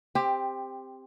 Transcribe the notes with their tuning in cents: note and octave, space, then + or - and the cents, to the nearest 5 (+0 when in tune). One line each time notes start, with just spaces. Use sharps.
C4 +0 G4 +15